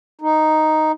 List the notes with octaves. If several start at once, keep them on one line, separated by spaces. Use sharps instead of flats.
D#4